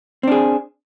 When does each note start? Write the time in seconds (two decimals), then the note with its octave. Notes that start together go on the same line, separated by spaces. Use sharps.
0.23 C4
0.28 D4
0.32 G#4